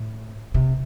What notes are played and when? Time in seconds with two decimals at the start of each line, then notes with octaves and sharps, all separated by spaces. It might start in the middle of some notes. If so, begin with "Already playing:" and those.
Already playing: A2
0.54 C3